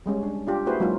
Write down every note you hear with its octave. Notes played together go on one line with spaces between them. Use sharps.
G3 G#3 C#4
D4
D4 F4 G4
A#3 E4 F#4 G#4 B4 C5
F#3 G#3 A#3 D#4 F4